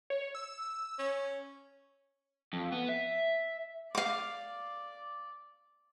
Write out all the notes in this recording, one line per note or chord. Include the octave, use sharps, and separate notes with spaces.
C#5
E6
C#4
F2
B3
E5
D5 F5 D6